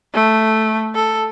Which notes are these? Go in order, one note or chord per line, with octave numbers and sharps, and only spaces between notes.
A3
A4